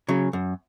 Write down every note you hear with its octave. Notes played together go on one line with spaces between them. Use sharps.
C#3 F#3
F#2